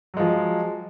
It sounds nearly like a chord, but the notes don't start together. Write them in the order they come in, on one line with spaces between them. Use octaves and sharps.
F#3 G#3 F3